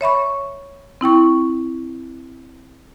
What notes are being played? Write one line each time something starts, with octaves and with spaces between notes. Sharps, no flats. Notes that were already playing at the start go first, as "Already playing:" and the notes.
C#5 E5 B5 C#6
C4 E4 G5 C#6